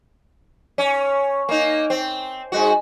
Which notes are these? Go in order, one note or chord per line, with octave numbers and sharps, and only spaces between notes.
C#4
A#3 D#4
C4
G#2 G#3 F#4